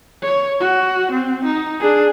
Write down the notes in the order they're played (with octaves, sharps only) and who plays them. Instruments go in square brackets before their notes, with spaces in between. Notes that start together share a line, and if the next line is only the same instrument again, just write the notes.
[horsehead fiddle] C#5
F#4
C4
D#4
D4 G#4